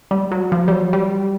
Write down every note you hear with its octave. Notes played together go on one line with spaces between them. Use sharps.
G3
F#3
F3
G3
F#3
G3